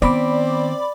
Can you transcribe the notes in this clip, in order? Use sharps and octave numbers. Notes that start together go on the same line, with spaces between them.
D#3 B3 C4 D5 B5 D6